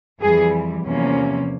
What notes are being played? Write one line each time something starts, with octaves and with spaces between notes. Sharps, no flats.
F2 E3 G3 G#4
E2 C3 F3 A#3 C#4